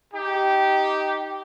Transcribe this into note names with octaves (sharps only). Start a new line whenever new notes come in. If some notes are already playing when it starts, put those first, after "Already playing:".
D#4 G4